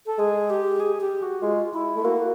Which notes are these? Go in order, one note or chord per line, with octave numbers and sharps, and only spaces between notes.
A4
G#3 G#4
G4
G#4
G4
F#4
G#3 F4
E4
A3
A#3 F#4